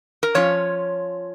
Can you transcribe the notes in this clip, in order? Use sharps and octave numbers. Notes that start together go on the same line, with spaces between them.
A#4
F3 C#4 F4 C#5